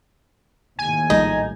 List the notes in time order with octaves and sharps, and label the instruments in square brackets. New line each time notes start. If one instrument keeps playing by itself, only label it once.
[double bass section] D#2 A2 [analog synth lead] G#5
[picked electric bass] A#1 G3 G#3 [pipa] D#4